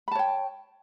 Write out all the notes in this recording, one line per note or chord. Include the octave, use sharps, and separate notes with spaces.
C#5 G5 A5 B5